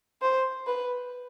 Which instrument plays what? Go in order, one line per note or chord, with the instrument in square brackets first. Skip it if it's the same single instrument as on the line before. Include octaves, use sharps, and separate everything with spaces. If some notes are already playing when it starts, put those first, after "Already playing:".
[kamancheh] C5
B4